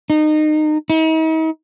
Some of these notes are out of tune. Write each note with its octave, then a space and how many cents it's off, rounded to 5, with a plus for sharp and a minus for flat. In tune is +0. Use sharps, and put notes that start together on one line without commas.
D#4 -25
D#4 +45